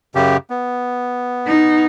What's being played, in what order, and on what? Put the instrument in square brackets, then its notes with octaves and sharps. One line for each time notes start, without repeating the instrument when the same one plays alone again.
[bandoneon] F#2 C#3 G4
B3
[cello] D#4